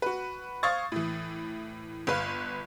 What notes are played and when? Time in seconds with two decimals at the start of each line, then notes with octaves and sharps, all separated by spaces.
0.02 F#4 B4
0.63 C5 F5 C#6 D#6 G#6 A6
0.92 A2 E3
2.07 G1 B4 F5